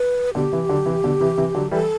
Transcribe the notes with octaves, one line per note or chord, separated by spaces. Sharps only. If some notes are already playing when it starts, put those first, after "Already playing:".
Already playing: B4
B2 D3 G4
C3 E3
D3 F#3
C3 E3
B2 D3
C3 E3
C3 E3
D3 F#3
E3 G3 A4